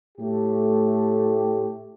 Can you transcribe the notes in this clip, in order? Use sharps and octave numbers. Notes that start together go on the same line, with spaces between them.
A2 A3 G4